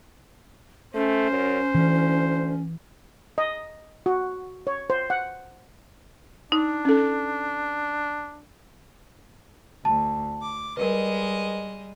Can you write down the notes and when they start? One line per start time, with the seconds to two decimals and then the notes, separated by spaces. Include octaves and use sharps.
0.95 A3 C#4 C5
1.30 F#2
1.75 D2 E3
3.38 D#5
4.06 F#4
4.67 C#5
4.90 C5
5.10 F#5
6.52 D4 D#4
6.85 C#4 A4
9.85 D2 A5
10.42 D6
10.77 G3 G#3 A#4 B4 D#5